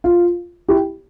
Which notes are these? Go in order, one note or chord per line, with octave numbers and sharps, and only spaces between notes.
F4
E4 G4